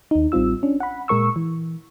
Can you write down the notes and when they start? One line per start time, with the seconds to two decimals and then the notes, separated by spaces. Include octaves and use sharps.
0.11 D#2 D#4
0.32 A1 G3 C4 F4 E6
0.63 C#4 D4
0.80 F#5 B5
1.08 A#2 G#3 A#4 C#6 E6
1.36 E3